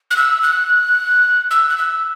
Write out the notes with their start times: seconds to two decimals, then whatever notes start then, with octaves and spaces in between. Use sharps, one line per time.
0.11 F#6
0.17 E6
0.43 F#6
1.51 E6
1.70 F#6
1.78 E6